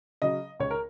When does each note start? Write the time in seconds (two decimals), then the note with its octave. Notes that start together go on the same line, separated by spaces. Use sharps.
0.22 C#3 F#3 D#5
0.60 C#2 C#5
0.71 A#4